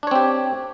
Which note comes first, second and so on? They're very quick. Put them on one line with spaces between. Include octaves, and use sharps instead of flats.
D4 C#5 C4 G4